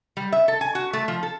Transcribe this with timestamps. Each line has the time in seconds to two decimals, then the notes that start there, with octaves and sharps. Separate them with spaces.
0.17 G3
0.32 E5
0.48 A4
0.61 G#5
0.75 F#4
0.93 A3
1.08 F3
1.23 A4